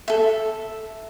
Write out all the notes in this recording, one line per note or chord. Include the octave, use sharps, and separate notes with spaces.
A4 E5